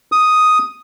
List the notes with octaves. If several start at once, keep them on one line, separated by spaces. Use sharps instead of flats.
D#6